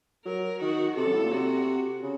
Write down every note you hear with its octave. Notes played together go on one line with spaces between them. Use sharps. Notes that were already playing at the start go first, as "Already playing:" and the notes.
F#3 A#4
D#3 F#4
C3 A4
F#2
A2
A#2
C3 F#4
C#3